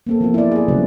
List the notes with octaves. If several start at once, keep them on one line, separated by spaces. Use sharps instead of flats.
A#3 C4 A4
F3 B3 F4
E4 D5
G#4 D5
C#3 F#3 G3 C4 B4